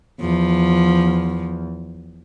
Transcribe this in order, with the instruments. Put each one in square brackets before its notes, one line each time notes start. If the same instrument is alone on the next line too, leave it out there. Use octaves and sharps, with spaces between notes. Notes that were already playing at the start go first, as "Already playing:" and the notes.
[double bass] E2 [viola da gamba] F3